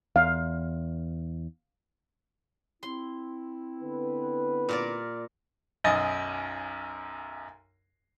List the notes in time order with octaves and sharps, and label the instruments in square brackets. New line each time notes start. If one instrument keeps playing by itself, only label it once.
[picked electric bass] E2 [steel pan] F5
[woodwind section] C4 E4 [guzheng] C6
[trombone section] D3 B3 B4
[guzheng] A#2 A#4 D5
[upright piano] B1 F#2 D#5 G#5 A6